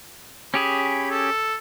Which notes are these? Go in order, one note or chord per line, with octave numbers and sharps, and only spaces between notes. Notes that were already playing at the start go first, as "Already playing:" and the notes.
C#4 G4 G#4 B5
A4